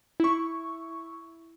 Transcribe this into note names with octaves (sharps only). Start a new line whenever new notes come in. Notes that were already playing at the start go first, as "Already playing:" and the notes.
E4 C#6